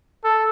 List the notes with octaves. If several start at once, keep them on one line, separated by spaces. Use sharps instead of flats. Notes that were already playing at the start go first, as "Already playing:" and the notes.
A4